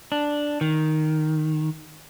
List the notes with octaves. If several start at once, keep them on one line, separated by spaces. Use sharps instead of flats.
D4
D#3